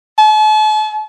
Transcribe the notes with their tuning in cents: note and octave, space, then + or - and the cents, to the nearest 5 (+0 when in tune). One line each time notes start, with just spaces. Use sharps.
A5 -40